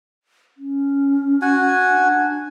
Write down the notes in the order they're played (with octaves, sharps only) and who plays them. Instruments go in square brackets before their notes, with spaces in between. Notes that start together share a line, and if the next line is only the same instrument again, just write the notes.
[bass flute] C#4
[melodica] F#4 G#5
[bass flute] D4